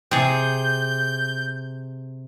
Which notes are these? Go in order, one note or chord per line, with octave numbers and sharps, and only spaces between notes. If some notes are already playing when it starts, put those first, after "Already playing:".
C3 G#4 G6